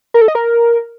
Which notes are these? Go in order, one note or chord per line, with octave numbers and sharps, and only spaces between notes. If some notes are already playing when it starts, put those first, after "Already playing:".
A#4
A4
D#5
A#4